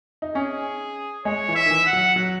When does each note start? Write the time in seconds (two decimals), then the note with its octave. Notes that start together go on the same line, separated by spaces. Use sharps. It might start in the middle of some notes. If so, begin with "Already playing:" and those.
0.22 D#4
0.35 C#4 G#4
1.25 G#3 C#5
1.48 E3
1.55 E5
1.66 D#3
1.70 E3
1.86 F#5
1.93 F#3
2.16 F#3